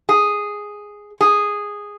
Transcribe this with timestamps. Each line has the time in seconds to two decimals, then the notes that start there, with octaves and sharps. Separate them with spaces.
0.09 G#4
1.21 G#4